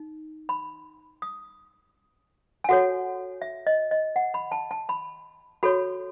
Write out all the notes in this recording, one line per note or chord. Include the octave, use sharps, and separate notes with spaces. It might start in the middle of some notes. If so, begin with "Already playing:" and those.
Already playing: D#4
B5
D#6
G#5
F#4 A4 C#5 F#5
E5
D#5
D#5
F#5
B5
A5
A5
B5
F#4 A4 C#5 B5